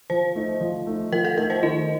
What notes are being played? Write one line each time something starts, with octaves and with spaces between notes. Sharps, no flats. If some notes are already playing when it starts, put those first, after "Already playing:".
F3 C5
A3 D#4
F3
A3 D#4
F3 A#4
A4
A3 D#4 A#4
C5
D#3 D#5